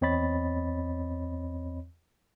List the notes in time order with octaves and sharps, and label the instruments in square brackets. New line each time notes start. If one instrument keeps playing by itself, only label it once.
[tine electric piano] E2 C4 C#5 D#5 B5 A6